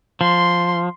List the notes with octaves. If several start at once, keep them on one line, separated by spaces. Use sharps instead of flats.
F3 C6